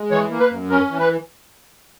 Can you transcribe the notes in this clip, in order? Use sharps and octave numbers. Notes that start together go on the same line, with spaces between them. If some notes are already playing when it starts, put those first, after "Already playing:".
Already playing: G#3
E3 C#5
A#3
B4
F#2
C#4 A#4
E3
B4